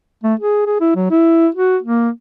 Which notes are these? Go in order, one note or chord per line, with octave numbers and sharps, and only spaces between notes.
A3
G#4
G#4
E4
F#3
E4
F#4
A#3